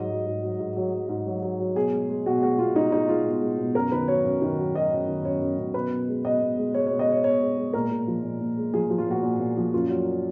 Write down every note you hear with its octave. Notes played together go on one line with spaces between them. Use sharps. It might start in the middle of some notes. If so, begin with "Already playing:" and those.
Already playing: G#2 F#3 D#5
F#3
G#2
F#3
G#2
F#3
F#3
G#2
F#3
F#3
F#3
B2 G#4
G#3
G#3
B2 F#4
G#3 F#4
B2 F4
G#3 D#4
G#3 D#4
G#3 F4
B2
G#3
B2
F#2 A#4
D#3 B4
F#3 C#5
F#2
D#3
F#3
F#3 D#5
F#2
D#3
F#2 C#5
F#2
F#2
B2 B4
B2
G#3
B2 D#5
B2
G#3
G#3 C#5
B2 C#5
D#5
G#3 C#5
B2 C#5
G#3
G#3
A#2 A#4
A#2
F3
A#2
A#2
G#3
F3 G#4
F3
F4
A#2 F#4
A#2
A#2
F3
F#2 F4
F#3